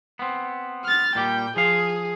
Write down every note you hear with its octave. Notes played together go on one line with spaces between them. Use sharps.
B3 C4
F6 A6
A#2 G3 G4 G5
F3 G#4 F5